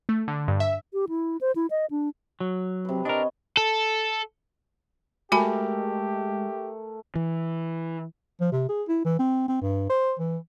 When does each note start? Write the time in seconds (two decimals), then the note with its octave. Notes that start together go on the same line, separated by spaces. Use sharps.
0.09 A3
0.28 D3
0.48 G2
0.60 E5
0.93 G4
1.09 E4
1.41 C5
1.56 E4
1.71 D#5
1.91 D4
2.40 F#3
2.85 C3 B4
3.05 D4 A#4 C#5 D#5
3.57 A4
5.32 G#3 A3 F#4 G4 A#4 G#5 B5
7.15 E3
8.40 F3
8.52 C3
8.69 G#4
8.88 E4
9.05 E3
9.19 C4
9.48 C4
9.62 G2
9.89 C5
10.19 E3